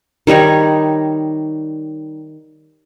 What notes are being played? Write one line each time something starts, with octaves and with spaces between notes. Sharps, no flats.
D#3 G3 D#4 C#5